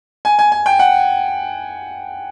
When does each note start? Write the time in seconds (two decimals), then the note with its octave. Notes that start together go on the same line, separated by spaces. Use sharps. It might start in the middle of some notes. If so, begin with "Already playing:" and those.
0.25 G#5
0.39 G#5
0.52 G#5
0.66 G5
0.79 F#5